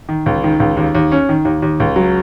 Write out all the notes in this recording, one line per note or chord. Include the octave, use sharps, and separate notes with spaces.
D#3
C#2
D#3
C#2
D#2
D#2
C#4
D#3
D#2
D#2
C#2
F#3